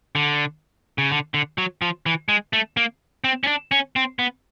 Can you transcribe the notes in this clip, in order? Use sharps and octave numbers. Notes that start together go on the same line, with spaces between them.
D3
C#3
D3
D3
F#3
F3
E3
G#3
A3
A#3
C4
C#4
D4
C#4
C4
B3